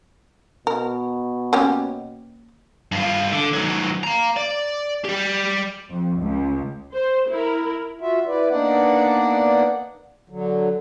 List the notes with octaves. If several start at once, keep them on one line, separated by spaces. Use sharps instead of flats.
B2 A#4
A#3 C#4 G4
G2 F4
D3
D#3 F#3
F5 A#5
D5
G3 G4
F2
C#2
C5
E4 A#4
F4 F#4 E5
E4 B4 D5
A#3 B3 D4 D#4 D5 F#5
D3 F#3